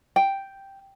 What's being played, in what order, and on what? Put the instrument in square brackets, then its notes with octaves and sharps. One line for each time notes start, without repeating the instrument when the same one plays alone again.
[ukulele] G5